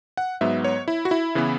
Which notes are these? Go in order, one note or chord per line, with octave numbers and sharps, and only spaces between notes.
F#5
G#2 F#3 B3 E5
C#5
E4
F#4
E4
C#3 E3 B3